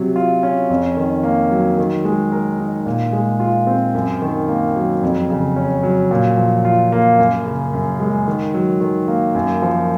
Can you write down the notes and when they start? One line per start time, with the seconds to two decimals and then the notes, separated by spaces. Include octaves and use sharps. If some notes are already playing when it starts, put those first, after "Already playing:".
Already playing: C3 F#3
0.16 F4
0.43 C#4
0.70 F2
0.97 D#3
1.23 A#3
1.51 F#3
1.78 D#3
2.05 G#3
2.32 A#4
2.60 D#4
2.86 A#2
3.13 G#3
3.40 F4
3.67 C4
3.95 F#2
4.22 D#3
4.48 A#3
4.76 F#3
5.03 F2
5.30 C#3
5.56 C#4
5.83 F#3
6.11 A#2
6.38 F3
6.65 F4
6.92 A#3
7.19 F#2
7.46 C#3
7.73 F#2
8.00 G#3
8.28 D#3
8.54 F#3
8.81 D#3
9.08 A#3
9.35 F#2
9.62 F3